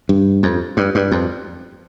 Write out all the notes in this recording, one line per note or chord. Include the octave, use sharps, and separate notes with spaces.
G2
F2
G2
G2
F2